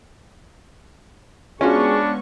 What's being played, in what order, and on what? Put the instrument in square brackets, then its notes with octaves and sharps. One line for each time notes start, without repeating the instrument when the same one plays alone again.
[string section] G#3 B3 C#6 [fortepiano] C#4 F4 F#4 [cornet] D4 [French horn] G#4